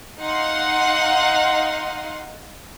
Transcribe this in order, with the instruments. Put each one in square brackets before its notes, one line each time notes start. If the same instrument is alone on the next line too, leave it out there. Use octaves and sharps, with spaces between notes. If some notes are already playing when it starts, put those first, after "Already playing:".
[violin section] D#4 F5 F#5 C6